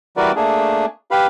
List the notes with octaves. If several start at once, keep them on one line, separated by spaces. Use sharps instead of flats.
E3 G3 F#4 A#4 B4 D5
A3 A#3 D4 G#4
G4 B4 F5 B5